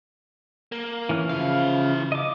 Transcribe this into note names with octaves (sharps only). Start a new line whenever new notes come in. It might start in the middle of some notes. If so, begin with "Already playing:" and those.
A#3
E3 C#4 F6
C#3 E3 F3 E4 F5
D#5 D6